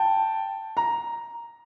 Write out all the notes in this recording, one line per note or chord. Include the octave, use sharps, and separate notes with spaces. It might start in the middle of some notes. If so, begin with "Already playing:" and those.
Already playing: G5 A5
A#5